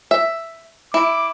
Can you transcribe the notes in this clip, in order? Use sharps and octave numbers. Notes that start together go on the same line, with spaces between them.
E5
E4 D6